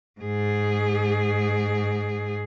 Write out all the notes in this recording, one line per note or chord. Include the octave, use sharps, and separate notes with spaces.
G#2 G#4